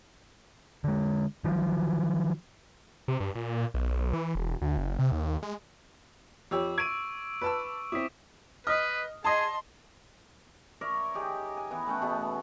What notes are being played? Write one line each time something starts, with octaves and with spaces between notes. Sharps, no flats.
D3 G#3
D#3 F3 F#3
C3
G2
A#2
B1
E3
E1
D2
F#1
C3
D#2
G#3
F2 G4 C#5 D6 E6
C#6 G#6 D7 D#7
B4 A5 E6
C4 E4 D6 D#6 B6
B4 D#5 D#6 F6
G#4 D#5 A5 C6
A#4 C#5 D5 E5
D#4 G4 G#4
G#5
E3 B3
A3 C#4 F#5 G5
B2 A3 B3 G#4